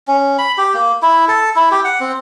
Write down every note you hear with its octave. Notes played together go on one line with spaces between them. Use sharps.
C#4
B5
G4
A#3
E4
A4
E4
G4
F#5
C4